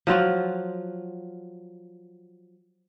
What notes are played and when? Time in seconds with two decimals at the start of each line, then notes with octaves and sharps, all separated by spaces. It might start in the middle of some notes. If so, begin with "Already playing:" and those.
0.07 F3 F#3 F4 F#4